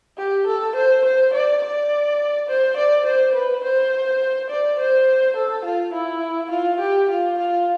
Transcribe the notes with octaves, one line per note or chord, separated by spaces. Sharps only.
G4
A4
C5
C5
D5
D5
C5
D5
C5
B4
C5
D5
C5
A4
F4
E4
F4
G4
F4
F4